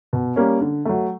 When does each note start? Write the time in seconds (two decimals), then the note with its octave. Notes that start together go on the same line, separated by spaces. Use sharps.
0.13 B2
0.36 G3 A#3 C#4
0.61 D3
0.85 F#3 A3